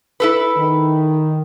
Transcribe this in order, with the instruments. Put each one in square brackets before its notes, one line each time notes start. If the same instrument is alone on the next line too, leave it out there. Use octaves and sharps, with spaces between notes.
[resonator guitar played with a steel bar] E4 A4 B4
[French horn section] D#3